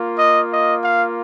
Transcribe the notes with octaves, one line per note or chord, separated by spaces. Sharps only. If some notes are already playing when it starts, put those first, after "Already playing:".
Already playing: A#3 F4
D#5
D#5
F5